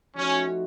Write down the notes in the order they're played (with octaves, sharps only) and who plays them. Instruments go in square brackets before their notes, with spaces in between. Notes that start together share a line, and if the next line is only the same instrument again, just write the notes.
[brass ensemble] F3 A3 C4 D#4 F#4 [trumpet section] C#4